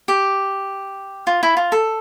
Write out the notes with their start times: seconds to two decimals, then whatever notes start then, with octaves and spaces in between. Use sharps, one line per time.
0.08 G4
1.27 F4
1.43 E4
1.57 F4
1.72 A4